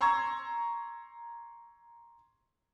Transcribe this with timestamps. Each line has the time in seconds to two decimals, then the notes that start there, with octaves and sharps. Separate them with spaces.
0.01 A#5 C6 C#6 E6 G#6